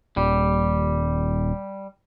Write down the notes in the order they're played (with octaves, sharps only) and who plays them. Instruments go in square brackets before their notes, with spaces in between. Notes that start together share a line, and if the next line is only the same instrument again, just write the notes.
[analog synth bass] D#1 [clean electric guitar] G3